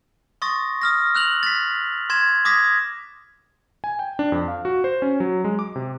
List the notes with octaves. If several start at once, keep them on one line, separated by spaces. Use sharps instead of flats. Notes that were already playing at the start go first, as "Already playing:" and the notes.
C6 C#6 D#6 A6 A#6
D#6 F6 A#6
E6 F#6 F7 F#7
A6 B6
C6 G#6 A6 E7
D6 D#6 G#6 A#6 B6
G#5
G5
D4
F2
F5
F#4
C5
C#4
F#3
G#3
D6
C3